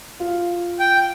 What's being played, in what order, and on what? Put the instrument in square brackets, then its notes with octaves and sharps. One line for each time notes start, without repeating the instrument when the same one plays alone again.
[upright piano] F4
[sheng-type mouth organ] G5